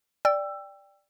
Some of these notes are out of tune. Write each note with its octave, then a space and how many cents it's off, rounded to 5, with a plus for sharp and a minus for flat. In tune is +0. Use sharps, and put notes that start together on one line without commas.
D5 +0 G5 +15 E6 +20